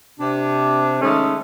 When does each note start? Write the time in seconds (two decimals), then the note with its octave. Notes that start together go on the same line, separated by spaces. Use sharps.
0.20 C3 D4
1.02 D#3 G#3 A3 C#4